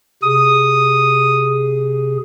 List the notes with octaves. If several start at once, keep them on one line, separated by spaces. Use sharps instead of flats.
C3 G#4 D#6